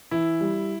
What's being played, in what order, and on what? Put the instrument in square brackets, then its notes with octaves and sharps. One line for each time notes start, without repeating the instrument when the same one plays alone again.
[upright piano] E3 [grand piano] E4
[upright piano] G3